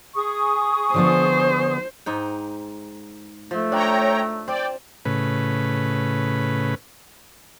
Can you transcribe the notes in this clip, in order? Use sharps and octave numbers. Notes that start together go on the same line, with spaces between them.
G#4 C#6 D#6
D3 F3 B3 C5
G#2 D#4 G5
F3 A3
D4 C#5 G5 A#5
C4 D5 G5
A2 C#3 B4